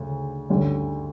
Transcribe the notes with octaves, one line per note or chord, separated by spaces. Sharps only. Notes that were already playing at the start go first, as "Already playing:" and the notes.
Already playing: D2 C#3
D2 D3 G3 C#4